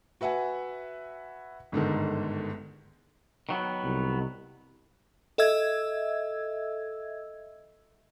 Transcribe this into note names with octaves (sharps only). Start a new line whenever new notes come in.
F#4 B4 E5 F#5 G#5
G1 G#2 D3 D#3
D#3 F#3 B3
C2
A4 D#5 E5 E6 G#6